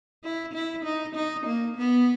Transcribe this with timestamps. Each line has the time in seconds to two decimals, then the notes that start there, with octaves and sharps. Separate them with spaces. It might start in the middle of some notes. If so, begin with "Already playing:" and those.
0.24 E4
0.54 E4
0.85 D#4
1.15 D#4
1.46 A#3
1.77 B3